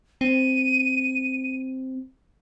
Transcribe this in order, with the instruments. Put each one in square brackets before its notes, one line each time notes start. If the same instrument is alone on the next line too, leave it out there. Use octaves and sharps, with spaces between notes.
[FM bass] C4 [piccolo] D#7